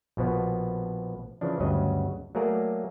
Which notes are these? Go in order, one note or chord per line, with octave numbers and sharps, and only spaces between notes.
A#1 B2 F3 B3
C#3 E3 F3 D4
D2 G2 C#3 F#3 D#5
F#3 A3 A#3 G#4 A#4 D5